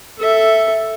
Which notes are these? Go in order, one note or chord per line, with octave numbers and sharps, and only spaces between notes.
A4 E5